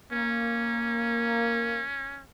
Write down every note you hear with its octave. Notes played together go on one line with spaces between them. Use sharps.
A#3 C#4